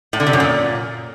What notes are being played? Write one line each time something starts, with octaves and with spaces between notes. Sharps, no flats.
A2
D3
C3
F#2
A#2